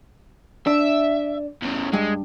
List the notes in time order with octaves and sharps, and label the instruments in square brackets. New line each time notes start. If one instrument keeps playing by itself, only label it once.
[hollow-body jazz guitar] D4 [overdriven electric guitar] E5
[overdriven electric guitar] E2 C#3
[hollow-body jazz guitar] G2 [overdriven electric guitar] G#3